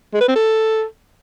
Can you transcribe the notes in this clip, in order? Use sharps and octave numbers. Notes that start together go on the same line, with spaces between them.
G#3
B4
C4
A4